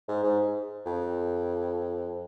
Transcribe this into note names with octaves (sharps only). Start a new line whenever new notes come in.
G#2
G#2
F2